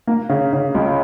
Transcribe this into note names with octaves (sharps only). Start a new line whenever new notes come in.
A#3
C#3
C#3
C#2